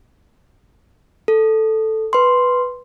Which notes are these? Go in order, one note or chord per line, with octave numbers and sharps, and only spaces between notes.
A4
B4 C6